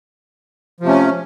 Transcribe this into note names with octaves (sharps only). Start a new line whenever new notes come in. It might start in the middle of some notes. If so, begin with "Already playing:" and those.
C3 F3 A3 C#4